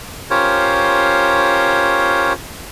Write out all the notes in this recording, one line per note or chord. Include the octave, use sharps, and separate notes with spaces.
C#4 F4 G4 A#4 C5 C#5